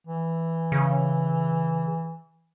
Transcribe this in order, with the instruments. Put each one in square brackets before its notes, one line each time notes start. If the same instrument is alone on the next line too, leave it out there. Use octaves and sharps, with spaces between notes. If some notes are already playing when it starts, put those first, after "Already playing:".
[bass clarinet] E3
[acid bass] C#3